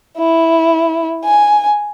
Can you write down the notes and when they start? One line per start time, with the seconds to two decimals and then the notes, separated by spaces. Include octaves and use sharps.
0.18 E4
1.25 G#5